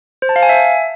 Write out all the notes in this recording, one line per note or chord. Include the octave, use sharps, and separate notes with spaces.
C5
A5
F5
G#5
E5